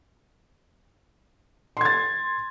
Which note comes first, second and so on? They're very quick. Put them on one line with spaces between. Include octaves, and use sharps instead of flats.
C6 G#6 A6